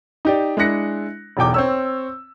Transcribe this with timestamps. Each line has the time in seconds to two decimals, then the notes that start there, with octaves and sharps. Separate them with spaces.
0.25 D#4 G4 D5
0.57 G#3 D4 E4 F#6 A#6 C#7
1.37 E1 B1 E2 G5 D6
1.54 C4 C#5 E6